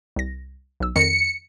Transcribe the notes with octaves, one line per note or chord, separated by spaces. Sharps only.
C2 A#6
B1 E6
F2 D#3 A#6 C#7